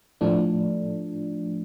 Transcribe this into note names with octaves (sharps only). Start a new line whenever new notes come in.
A2 F3 A3 D4